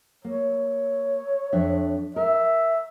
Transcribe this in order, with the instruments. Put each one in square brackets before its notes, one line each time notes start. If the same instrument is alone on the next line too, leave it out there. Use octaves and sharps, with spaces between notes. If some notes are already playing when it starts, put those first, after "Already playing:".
[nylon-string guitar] A#3 [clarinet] C#5
[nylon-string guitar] F2 D4 E5
[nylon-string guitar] A#4 [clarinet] E5